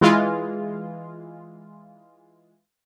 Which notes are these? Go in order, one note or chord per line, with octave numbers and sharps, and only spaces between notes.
E3 G#3 F4